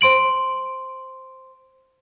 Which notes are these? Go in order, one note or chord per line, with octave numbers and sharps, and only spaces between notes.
C5 C6 D7 F#7